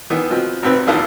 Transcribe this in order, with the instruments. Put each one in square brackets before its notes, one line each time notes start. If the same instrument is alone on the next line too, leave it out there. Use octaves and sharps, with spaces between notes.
[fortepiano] D#3 E3 B3
B2 F3 C4
G#1 C3 C4 B4
A#1 D#2 E4 F4 A4 F#5